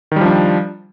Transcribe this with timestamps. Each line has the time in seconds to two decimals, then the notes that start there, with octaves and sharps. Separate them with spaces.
0.12 D#3
0.16 G3
0.21 F3
0.26 D4